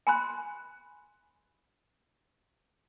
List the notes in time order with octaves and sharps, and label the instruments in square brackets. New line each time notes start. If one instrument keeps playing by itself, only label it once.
[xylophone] G#5 B5 C6 F#6